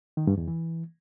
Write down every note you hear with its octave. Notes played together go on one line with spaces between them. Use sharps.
D#3
G2
E2
E3